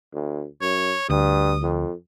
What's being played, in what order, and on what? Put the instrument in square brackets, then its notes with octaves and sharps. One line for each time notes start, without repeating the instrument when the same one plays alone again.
[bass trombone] D2
[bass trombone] F#2 [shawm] C#5
[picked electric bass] D2 [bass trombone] G2 [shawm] D#6
[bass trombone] F2